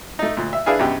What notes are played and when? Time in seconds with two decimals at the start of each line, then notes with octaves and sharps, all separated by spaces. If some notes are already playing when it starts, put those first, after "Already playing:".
0.19 A3 D#4
0.37 D2 A#2
0.53 E5
0.66 D4 E4 G#4 B4 F5 G#5
0.79 F#2 B2 G4